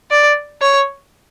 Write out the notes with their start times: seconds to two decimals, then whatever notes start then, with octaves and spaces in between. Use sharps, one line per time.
0.11 D5
0.61 C#5